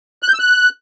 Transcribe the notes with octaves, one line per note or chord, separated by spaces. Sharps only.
F#6
G6
E6
F#6